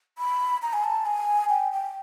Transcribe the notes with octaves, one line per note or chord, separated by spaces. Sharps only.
B5
A#5
G#5
A5
G#5
G5
G5